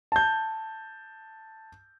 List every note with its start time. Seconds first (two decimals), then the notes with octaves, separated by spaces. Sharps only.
0.12 A5 G6